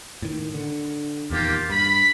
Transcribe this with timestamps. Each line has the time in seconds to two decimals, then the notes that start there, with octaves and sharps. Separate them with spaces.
0.22 A2 D#3
0.54 D3
1.30 D#1 E2 D#3 A#3 F4 G4
1.70 G2 B5